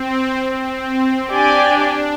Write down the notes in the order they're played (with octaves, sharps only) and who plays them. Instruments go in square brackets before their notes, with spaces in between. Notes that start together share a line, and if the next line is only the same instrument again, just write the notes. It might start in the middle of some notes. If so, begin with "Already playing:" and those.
Already playing: [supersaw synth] C4
C4
[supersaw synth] D4 [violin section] G4 D5 G#5